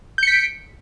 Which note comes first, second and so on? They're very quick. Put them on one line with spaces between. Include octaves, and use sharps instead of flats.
G6 C#7 B6 D7